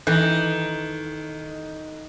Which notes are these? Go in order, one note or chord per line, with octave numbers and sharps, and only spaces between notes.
D#3 E3 A4 F#6 G6